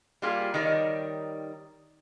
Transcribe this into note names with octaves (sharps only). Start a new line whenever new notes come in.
G3 A#3 F4 G4 G#4
D#3 G3 D#4 A#4 C#5 D5